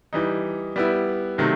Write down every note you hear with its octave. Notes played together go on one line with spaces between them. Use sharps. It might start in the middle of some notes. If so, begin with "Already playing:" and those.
E3 G3 D#4
G3 B3 E4
C3 D#3 F#3 A3